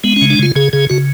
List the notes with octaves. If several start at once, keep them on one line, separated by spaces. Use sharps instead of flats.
G#3 B3
C#4
C#3
D4
C#3 F4
C#3 G#4
C#3 G#4
C#3 F#4